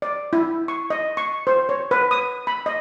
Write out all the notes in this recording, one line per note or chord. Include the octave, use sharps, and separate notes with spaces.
D5
E4
C#6
D#5
C#6
C5
C#5
B4
D#6
B5
D#5